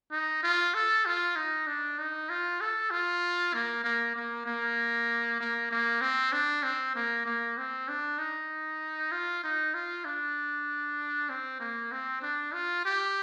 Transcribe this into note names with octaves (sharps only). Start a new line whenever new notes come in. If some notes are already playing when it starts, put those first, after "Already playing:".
D#4
F4
A4
F4
D#4
D4
D#4
F4
A4
F4
A#3
A#3
A#3
A#3
A#3
A#3
C4
D4
C4
A#3
A#3
C4
D4
D#4
F4
D#4
F4
D4
C4
A#3
C4
D4
F4
G4